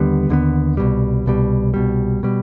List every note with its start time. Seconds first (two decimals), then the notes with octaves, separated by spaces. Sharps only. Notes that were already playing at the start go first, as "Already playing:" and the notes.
Already playing: D#2 D3 G3 B3
0.29 D#2 D3 G3 B3
0.77 C2 B2 G3
1.26 C2 B2 G3
1.74 C2 B2 G3
2.23 B2 G3